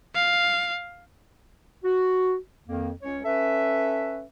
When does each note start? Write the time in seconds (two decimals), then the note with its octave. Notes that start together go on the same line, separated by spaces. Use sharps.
0.15 F5
1.84 F#4
2.68 F2 D#3 A#3
3.02 C#2 C#4 C#5
3.24 C#4 A4 B4 E5